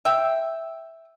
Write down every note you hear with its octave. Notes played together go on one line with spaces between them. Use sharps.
E5 G5